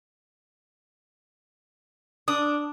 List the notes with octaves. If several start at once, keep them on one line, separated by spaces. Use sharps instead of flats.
D4 D#6